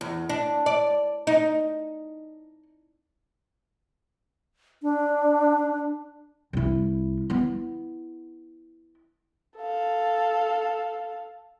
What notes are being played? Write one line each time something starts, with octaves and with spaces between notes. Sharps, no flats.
E2
D4
D5
D#4
D4
C2 E4
B3 E4
A4 F5